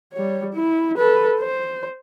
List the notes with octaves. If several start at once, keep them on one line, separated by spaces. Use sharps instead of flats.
G3 C#5
E4
A4 B4
C5